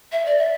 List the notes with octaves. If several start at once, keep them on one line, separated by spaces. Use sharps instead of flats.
E5
D5
E5